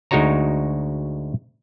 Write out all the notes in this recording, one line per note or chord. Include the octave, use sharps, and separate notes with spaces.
D2 G#3 D#4 F#4 C#5 A#5